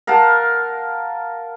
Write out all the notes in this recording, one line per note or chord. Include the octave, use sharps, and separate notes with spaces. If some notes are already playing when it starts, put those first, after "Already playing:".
A#4 F5 F#5 A5